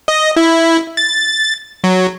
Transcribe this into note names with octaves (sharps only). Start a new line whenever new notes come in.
D#5
E4
A6
F#3